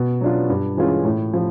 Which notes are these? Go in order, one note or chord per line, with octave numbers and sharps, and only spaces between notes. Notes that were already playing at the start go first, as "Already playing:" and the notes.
Already playing: B2
F#3 B3 D4 F4
G2
E3 G#3 C#4 F4
A2
F3